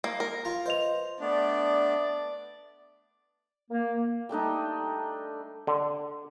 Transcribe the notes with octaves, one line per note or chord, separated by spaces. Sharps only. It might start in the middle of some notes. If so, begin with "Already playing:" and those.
A#3
A#4
F4 A#5
B4 C5 D#5 F7
A3 B3 D4 D5
A#3
G3 A3 D4 D#4
D3